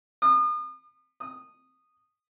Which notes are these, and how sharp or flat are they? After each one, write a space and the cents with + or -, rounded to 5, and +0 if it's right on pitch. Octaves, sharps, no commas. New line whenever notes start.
D#6 -40
D#6 -15